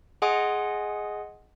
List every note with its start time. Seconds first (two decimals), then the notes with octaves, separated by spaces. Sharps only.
0.22 G#4 D#5 F#5 G#5 C6 D#6